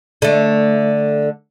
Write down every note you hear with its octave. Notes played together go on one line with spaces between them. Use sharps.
D3 A3